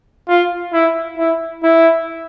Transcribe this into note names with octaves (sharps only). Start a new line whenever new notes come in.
F4
E4
E4
E4